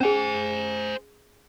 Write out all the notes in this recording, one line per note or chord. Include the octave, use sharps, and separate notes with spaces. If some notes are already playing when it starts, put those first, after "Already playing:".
C#4 G#4 C5 G#5